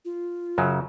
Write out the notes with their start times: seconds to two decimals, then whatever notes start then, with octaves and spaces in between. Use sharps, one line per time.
0.05 F4
0.58 F#2 C#3 F#3